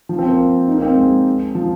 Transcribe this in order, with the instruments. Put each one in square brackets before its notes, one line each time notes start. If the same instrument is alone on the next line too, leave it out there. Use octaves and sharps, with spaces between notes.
[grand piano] F3
C4
A#3
D#4
A#3
C4
G#3
F3